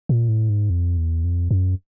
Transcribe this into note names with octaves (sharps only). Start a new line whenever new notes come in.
A#2
A2
G#2
F2
E2
F2
F#2